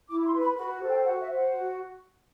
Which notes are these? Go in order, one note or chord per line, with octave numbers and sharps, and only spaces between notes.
E4 D6
C6
B4
B5
F#4 B5
A4 C5
G5
F#4 F#5
E5
C5
F#5
F#4